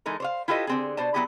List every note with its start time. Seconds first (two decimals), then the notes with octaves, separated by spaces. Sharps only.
0.06 E3 G#3 D#4 A4 A#4
0.20 C5 C#5 F5
0.48 E4 F4 G4 A4 B4 D#5
0.67 D3 C4 G#4
0.97 B2 C5 D5 A5
1.14 F#3 G#3 B3 E4 G4 G#4